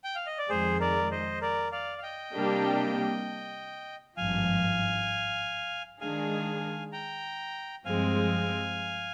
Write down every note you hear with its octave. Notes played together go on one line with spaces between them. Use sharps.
G5
F5
D#5
D5
F2 D#3 G#3 G#4 C5
A#4 D5
C5 D#5
A#4 D5
D5 F5
F5
D#5 G5
C3 G3 A#3 D4 G4
G#1 G2 F3 F5 G#5
D#3 G#3 D4 G#4 F5 G#5
G5 A#5
G2 F3 G#3 C4 F5 G#5